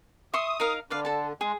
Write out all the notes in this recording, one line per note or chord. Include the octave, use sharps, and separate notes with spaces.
E5 C6 C#6 D#6
D#4 A#4 F5
D3 B4 D5 F5
A4 A5
G#3 G#4